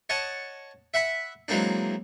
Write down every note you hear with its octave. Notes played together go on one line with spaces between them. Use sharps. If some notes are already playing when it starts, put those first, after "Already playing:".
C#5 D#5 F#5 A5
E5 F#5 B5
E3 F#3 G#3 A#3 C4 D4